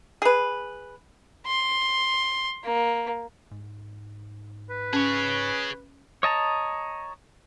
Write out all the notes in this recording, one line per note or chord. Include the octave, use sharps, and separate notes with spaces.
G#4 B4
C6
A#3
G#2
B4
C#4 G#4 C#5
C#5 D#5 A5 A#5